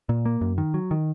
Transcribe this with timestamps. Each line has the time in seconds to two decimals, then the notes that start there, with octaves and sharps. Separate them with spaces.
0.09 A#2
0.25 A#3
0.41 F#2
0.58 D#3
0.74 F#3
0.91 D#3